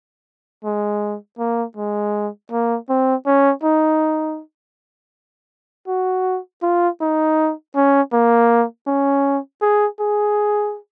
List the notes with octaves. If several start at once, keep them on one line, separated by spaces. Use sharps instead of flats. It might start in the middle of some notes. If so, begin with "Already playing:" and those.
G#3
A#3
G#3
A#3
C4
C#4
D#4
F#4
F4
D#4
C#4
A#3
C#4
G#4
G#4